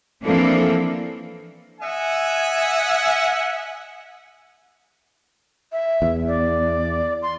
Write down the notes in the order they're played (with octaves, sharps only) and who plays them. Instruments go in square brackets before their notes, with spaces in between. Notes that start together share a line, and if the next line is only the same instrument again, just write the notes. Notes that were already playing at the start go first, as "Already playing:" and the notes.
[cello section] E3 F3 A#3 C4 D4 A4
[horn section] D#5 E5 F#5 G#5
[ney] E5
[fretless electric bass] E2
[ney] D5
C6